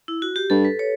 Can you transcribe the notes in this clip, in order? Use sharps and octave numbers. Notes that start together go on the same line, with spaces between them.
E4
F#4
G4
G2 A4
B4
C#5